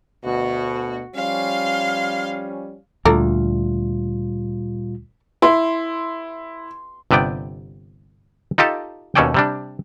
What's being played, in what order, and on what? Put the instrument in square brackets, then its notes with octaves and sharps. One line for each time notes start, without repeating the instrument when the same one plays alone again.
[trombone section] D2 B2 [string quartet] F#4
[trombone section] F3 G3 C#4 [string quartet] F5 C6
[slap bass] D2 [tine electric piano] A#2 G3 F4 [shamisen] A4 D5 A#5
[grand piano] E4 [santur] C6
[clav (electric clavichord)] G1 C3 B3 D5 G5
D#4 F4 G4 A4 A5
D#2 B2 C#4 A4 D5 G5
C3 G3 D4